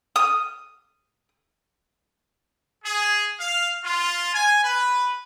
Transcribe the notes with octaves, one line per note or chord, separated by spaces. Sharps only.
D#6
G#4
F5
F4
G#5
B4